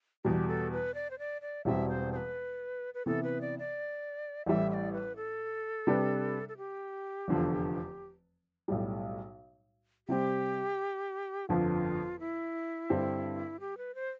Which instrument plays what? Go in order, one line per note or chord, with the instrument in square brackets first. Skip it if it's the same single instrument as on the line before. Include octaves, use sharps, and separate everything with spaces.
[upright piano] E2 B2 G3 [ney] G4
[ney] A4
B4
D5
C5
D5
D5
[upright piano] E1 E2 B2 G3 C4 [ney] E5
[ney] C5
C5
B4
B4
[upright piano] C3 E3 B3 [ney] A4
[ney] B4
D5
D5
[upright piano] A1 A2 E3 G3 [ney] E5
[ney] E5
D5
B4
A4
[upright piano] C3 G3 D4 G4 B4
[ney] A4
G4
[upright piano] F1 E2 D3 F3
B1 A2 G3
[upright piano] C3 G3 C4 [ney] G4
[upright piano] G1 F2 D3 F3 [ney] F4
[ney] E4
[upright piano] G2 D3 G3 C4
[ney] G4
B4
C5